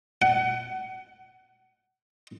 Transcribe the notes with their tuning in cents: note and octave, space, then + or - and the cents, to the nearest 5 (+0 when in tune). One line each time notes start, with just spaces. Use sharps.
F#5 +30